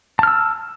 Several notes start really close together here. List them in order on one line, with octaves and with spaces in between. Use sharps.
A5 F6 E6